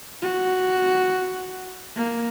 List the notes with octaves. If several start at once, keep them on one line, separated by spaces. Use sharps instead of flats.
F#4
A#3